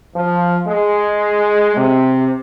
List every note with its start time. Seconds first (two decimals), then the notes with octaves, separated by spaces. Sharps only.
0.15 F3
0.66 G#3
1.76 C3